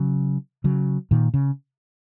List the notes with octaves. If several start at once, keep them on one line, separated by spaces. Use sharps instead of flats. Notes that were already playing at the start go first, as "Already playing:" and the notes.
Already playing: C#3 F#3
C#3 F#3
A#2 D#3
C#3